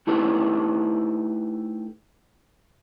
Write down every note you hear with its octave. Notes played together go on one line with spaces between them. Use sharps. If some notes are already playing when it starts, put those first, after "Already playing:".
A3 D#4 E4 G4 A4 B4